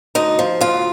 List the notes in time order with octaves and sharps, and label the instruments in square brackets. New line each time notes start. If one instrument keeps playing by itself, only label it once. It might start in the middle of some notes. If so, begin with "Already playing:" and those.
[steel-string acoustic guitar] D2 D#4
F3
D2 F4